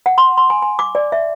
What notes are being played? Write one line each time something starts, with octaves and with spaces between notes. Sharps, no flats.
F#5
C6
C6
G#5
G#5
D6
D5
E5